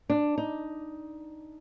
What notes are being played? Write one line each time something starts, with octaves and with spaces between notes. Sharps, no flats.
D4
D#4